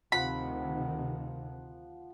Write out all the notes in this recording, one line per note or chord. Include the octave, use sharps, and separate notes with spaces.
D2 C3 D#3 F3 F#5 B5